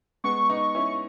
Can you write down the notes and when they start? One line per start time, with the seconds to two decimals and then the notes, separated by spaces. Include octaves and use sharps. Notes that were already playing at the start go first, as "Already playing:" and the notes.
0.24 G#3 B3 C#6
0.50 B3 D#4
0.75 C#4 E4